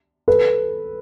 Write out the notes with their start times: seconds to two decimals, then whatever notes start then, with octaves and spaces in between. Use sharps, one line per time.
0.28 A4 B4